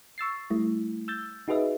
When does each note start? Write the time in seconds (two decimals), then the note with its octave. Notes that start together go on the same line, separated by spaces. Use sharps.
0.18 C#6 E6 A6 C7
0.50 G3 A3 E4
1.08 E6 G6 A6
1.48 D#4 F#4 G#4 B4 D#5 E5